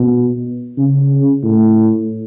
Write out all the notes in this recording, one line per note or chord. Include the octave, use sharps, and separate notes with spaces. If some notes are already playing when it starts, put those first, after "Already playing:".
Already playing: B2
C#3
A2